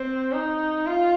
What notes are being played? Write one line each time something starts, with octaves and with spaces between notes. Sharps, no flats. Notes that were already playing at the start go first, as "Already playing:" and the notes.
Already playing: C4
D#4
F4